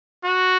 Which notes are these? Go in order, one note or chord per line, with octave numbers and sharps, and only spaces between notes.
F#4